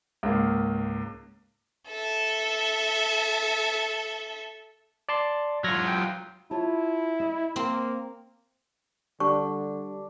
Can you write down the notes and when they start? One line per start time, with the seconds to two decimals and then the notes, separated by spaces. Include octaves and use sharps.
0.23 C#2 G#2 A#3
1.90 A4 E5
5.09 D5 A5 C6
5.64 F#3 F4 F6 G#6 A#6
5.88 G5
6.51 E4 F4 C#5 A5
7.20 D#5
7.56 A#3 C4 A#4
9.20 D3 G3 D4 C#6